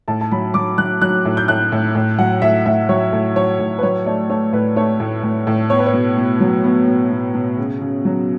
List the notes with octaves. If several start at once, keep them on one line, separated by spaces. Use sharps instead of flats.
A2 A5
A5
F#3 B5
F#3 D6
F#3 F#6
F#3 F#6
A2
G6
A2 F#6
A2
A2
F#3 F#5
A2 E5
A2 E5
F#3 C#5
A2
F#3 C#5
A2
B4
F#3 C#5
A3 D5
A3 C#5
A2 B4
A3 C#5
A2
A2
A2
B3 C#5
B4
C#5
B2
B2
F#3
B3
B2
B2
B2
C#3
C#3
F#3